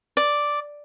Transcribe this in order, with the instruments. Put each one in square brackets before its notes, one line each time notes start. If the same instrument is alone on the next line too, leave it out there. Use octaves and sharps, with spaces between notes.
[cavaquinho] D5